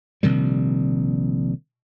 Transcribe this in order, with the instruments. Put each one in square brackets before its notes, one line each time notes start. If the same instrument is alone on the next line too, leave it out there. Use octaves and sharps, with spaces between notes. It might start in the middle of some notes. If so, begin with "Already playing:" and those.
[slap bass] A#1 C3 D#3 G3